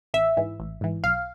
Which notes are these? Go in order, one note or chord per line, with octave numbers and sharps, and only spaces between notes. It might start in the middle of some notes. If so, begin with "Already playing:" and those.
A1 E5
G#2 E3
A1
G#2 E3
B1 F5